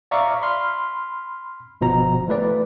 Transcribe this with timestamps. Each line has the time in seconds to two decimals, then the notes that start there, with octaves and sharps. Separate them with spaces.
0.11 D5 E5 F5 A#5 C#6 D6
0.42 B5 C6 F6
1.81 G1 B2 F3 A#5
2.28 E3 A3 B4 D5